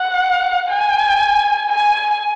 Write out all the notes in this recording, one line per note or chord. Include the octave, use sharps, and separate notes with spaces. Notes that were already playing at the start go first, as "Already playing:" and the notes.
Already playing: F#5
G#5
G#5